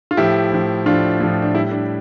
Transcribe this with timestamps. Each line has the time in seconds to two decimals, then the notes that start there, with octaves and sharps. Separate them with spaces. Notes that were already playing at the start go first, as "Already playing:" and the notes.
0.11 F4
0.17 A2 F3 E4 G4
0.51 A2 F3
0.86 A2 F3 D4 F4
1.20 A2 F3
1.42 D4
1.55 A2 G3 E4
1.71 D4